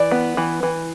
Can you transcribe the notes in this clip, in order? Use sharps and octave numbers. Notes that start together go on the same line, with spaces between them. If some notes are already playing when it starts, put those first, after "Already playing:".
Already playing: E3 D5
B3
E3
E3